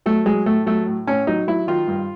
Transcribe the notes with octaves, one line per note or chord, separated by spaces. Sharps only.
F#3 A3
F#3 G#3
A2 A3
F#3 A3
A2
A2 C#4
F#3 D#4
F#3 E4
D#3 F4
G2